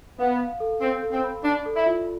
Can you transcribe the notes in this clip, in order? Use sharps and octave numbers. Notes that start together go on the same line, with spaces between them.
B3 F5
F5
A4
C4 A4
A4
C4
B5
D4 D5
A4
E4
F4